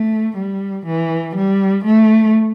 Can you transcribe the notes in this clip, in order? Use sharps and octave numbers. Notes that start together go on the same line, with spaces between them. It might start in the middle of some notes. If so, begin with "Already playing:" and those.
Already playing: A3
G3
E3
G3
A3